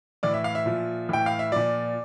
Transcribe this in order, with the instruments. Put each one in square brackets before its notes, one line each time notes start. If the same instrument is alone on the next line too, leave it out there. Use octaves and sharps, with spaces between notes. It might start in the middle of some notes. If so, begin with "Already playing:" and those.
[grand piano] A2 E3 D5
E5
F5
E5
A#2 F3
A2 E3 G5
F5
E5
A#2 F3 D5